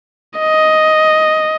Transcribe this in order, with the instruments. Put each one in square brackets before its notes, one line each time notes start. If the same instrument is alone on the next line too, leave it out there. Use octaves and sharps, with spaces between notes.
[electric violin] D#5